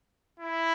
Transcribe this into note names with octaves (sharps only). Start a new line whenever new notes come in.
E4